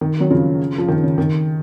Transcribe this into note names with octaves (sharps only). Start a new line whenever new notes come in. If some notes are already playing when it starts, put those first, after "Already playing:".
D#3
D#3 F#3
C#3 F3
F3
D#3
C#3
D#3